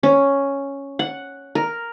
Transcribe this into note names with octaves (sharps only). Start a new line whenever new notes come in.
C#4
F#5
A#4